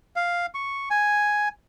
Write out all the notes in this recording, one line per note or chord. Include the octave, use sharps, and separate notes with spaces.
F5
C#6
G#5